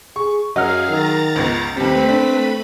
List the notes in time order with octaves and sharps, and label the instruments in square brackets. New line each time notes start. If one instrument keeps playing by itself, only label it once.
[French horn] G#4 [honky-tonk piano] C#6
[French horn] F#2 [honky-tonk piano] F#3 [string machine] G#4 F5 [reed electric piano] D#5 F#5 F6
[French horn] D#3 [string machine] A#5 A6
[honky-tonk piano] G1 C#2
[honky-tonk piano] D#2 G3 [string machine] A3 B4 B5 [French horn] C4
[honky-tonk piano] D4